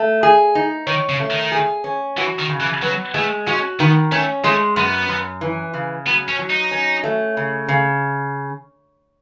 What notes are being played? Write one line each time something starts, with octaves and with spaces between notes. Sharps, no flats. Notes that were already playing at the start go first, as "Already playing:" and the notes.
Already playing: A3
G#4
D#4
D#3 C#5
C#3
A3
D#3
G#4
C#4
E3 F#4
D#3
C#3
E3
F#3 B3
G#3 A3
C#4 F#4
D#3 B3
A3 C#4
G#3 A3
F#2 B3
F#2
E3
C#3
F#3 B3
C#4
F#3
D#4
C#4
A3
C#3
C#3